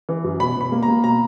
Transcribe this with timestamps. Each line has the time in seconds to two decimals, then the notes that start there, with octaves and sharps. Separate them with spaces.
0.09 E3
0.24 F#2
0.40 B2 B5
0.56 B2 B5
0.72 A#3
0.83 A#5
0.88 A#3
1.04 B2 A#5